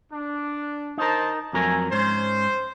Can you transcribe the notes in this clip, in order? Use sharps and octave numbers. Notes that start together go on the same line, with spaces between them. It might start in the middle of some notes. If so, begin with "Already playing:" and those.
D4
D#4 A#4 C5 A5
F2 F#3 A3 A#4 G#5
G#2 C#4 C5